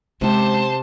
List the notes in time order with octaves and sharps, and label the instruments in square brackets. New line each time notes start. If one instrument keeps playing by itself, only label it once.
[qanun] C3 G4 [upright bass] G#3 C#4 [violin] C5 A5